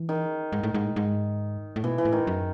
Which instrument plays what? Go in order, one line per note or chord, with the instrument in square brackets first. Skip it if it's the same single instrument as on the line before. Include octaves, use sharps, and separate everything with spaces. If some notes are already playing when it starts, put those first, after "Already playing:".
Already playing: [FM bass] E3
[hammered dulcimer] D#3
[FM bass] G#2
A2
G#2
A2
G#2
A2
[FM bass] B2 [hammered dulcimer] E3
[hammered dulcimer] E3
[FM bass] A2
[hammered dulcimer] D#3
[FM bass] F#2